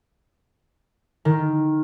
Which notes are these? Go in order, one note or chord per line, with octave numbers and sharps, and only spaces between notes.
D#3